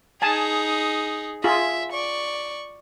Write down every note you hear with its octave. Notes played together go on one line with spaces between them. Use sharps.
D#4 G#4 G#5 A5
F4 G#4 E5
D5 C#6